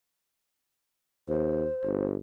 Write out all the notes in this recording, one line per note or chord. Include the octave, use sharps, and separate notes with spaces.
D#2 C5
G1